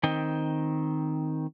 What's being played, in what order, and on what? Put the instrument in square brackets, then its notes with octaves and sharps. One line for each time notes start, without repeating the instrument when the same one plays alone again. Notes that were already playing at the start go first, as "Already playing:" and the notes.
[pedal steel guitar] D#3 C4 D#5 G5